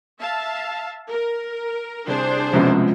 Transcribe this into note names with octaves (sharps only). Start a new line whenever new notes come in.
E5 F5 A5
A#4
C2 D4 G#4 C5
C2 F#2 B2 F3 G#3 C#4